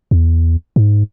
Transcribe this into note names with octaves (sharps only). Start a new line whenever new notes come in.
E2
G#2